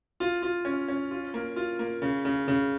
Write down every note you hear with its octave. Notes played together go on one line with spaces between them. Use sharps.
F4
F4
C#4
C#4
F4
A#3
F4
A#3
C#3
C#3
C#3